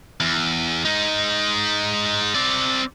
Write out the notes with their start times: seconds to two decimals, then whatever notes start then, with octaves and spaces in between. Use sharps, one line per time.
0.20 E2
0.85 G#3 D#4
2.35 C4 D5